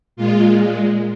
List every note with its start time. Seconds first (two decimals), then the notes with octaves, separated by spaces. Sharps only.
0.16 A#2 G#3 F4